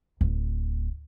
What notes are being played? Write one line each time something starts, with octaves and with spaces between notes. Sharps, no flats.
D1